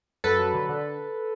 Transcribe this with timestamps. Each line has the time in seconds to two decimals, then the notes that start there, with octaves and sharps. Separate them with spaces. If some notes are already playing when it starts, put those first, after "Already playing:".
0.24 F#2 A4 B4
0.39 F#3
0.54 D3
0.69 D3